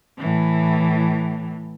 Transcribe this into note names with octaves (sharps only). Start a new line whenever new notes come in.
A2 E3